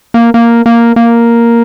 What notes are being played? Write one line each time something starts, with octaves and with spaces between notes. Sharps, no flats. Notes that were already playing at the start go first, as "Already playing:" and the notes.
A#3
A#3
A#3
A#3